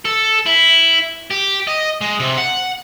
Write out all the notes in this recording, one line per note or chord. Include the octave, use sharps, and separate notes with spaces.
A4
E4
G4
D#5
G#3
C3
F#5